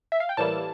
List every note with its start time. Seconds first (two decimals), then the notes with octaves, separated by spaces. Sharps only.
0.12 E5
0.20 F5
0.29 G5
0.37 A2 E3 G3 A#3 E4 A5